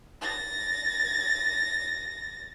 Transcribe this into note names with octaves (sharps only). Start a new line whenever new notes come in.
A6 A#6